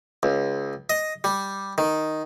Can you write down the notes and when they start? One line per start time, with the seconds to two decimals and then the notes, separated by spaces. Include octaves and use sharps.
0.23 C#2
0.90 D#5
1.24 G3
1.78 D#3